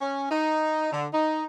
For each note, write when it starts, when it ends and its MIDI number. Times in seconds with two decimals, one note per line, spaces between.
0.01 0.28 61
0.30 0.88 63
0.92 1.07 50
1.13 1.43 63